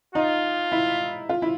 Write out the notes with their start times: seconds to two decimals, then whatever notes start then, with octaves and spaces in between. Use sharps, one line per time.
0.15 D#4 F4
0.72 E4
1.29 F4
1.42 E4